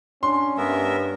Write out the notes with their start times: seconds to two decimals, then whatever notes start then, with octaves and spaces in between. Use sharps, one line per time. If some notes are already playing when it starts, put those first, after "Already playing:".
0.23 C#4 D4 C6
0.57 G2 B3 A#4 E5